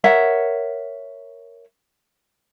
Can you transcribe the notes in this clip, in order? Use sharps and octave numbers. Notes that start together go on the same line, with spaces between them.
A#4 C#5 E5 F#5